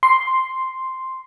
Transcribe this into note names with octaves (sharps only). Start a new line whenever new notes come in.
C6